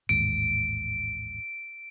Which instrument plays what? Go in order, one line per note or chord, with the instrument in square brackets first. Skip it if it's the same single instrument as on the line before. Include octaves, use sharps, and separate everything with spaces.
[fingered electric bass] A1 D#2 G#2 [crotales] D7